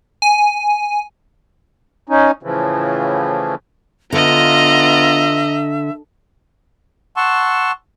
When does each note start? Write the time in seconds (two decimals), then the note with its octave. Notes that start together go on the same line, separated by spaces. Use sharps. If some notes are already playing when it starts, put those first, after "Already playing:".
0.22 G#5
2.09 C#4 D#4
2.43 A2 C#3 E3 F3
4.12 D3 B3 F4 D#5 E5 A#5
7.17 F#5 A5 C6 C#6 E6